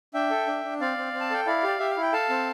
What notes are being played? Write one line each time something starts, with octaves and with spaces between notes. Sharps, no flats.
D4 E5 G5
A4
D4
D4
C4 D5 F5
C4
C4
A5
A4 G5
E4 D5 F5
G4 D5
G4 E5
F5
E4
G5
A4 F5 A5
C4